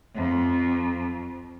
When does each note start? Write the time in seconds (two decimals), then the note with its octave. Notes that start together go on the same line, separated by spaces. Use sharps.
0.15 F2